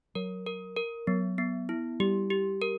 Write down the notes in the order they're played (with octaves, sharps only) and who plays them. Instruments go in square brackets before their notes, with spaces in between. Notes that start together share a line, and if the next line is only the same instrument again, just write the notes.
[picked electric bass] F#3 [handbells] A#4
[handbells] A#4
A#4
[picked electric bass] F#3 [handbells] B3
[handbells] B3
E4
[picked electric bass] G3 [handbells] G4
[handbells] G4
A#4